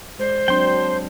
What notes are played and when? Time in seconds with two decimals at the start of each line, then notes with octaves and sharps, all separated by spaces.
0.19 G#3 C5 D5
0.48 F#3 C4 D4 G5 C6